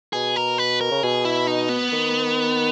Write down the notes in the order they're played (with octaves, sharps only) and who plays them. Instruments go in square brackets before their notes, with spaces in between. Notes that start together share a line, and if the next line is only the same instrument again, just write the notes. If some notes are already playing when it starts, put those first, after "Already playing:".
[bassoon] B2 [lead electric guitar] G#4
[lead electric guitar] A#4
B4
A#4
[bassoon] C#3
[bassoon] B2 [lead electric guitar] G#4
[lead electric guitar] E4
D#4
B3
[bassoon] D#3